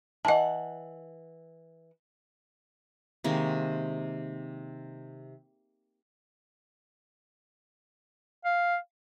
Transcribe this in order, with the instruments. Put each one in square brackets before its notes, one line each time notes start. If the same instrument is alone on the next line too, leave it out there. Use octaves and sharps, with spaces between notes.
[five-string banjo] E3 F#5 [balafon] D#5 A5
[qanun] C3 D#3 G#3 A#3
[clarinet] F5